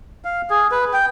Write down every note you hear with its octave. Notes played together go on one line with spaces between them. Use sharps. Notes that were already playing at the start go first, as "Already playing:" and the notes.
F5
G#4
B4
G5